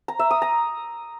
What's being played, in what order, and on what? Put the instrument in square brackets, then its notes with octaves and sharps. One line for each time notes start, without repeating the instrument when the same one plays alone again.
[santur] A#5
E5
D#6
A#5